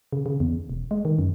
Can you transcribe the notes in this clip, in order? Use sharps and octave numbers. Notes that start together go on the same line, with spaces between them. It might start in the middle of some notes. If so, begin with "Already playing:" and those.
C#3
C#3
E2
E1
G#3
D#3
F#2